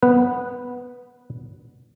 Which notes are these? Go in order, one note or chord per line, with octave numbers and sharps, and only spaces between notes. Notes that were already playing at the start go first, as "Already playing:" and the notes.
B3 B4